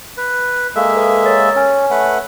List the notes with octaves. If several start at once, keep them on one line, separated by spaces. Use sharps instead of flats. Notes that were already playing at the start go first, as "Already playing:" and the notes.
B4
G#3 A#3 A4 E5 F5
A4 B4 D#6
A#4 C#5 A6
C#4 C#5 G#5
A3 B4 F#5